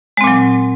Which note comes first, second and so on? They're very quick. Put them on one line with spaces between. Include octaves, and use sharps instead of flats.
G#3 C4 A#2 F#3